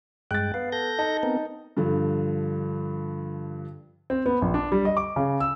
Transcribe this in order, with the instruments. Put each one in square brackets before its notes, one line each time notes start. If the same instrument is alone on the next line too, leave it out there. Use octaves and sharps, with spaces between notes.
[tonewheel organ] G2 G#3 G5 [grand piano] F#6 A6
[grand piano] B3 [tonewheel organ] F5
[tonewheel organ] A4 G6 A#6
[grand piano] D#4 A5
[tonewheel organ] B3 C4 A#4
[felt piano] G2 D3 F3
[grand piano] C4
B3
A#1
D4
G3
D#5
D6
C#3
E6